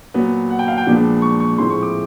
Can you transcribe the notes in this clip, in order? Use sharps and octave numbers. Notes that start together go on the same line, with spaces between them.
A#2 F#3 B3
F#5
G5
F5
G5
A#2 F3 G#3 B3 D4
C#6
C#6
A2 F3 G#3 C4 E4 C6
C#6
D6